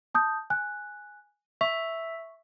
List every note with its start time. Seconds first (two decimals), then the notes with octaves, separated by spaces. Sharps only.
0.15 A5 D#6 G6
0.50 G#5 F#6
1.61 E5 C#6